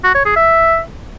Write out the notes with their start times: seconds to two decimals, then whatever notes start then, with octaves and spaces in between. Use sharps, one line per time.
0.04 F#4
0.15 C#5
0.25 G#4
0.36 E5